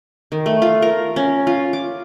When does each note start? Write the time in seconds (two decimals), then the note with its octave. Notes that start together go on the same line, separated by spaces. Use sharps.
0.32 D#3
0.46 A3
0.62 F4
0.82 A#4
1.16 C#4
1.47 F4
1.73 D6